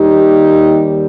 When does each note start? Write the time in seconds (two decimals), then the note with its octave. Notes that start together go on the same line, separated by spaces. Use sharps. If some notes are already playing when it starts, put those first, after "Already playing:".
Already playing: D#2 D#3 G3 D#4 G4